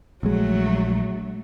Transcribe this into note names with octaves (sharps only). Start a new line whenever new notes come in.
A#1 F#3 G#3 A3